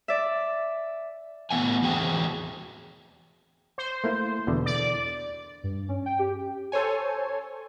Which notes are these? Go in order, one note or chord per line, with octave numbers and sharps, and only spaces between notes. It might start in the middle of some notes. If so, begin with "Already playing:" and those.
D5 E5
A2 A3 B3 F#5 G#5
E2 C4 F#4 G#4 G5
C5
A3 A#3 E4
E2 B2 D3
D5
G2
C#4
G5
G4
A4 C5 C#5 G#5